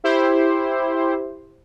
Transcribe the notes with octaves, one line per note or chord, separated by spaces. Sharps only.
E4 G4 C5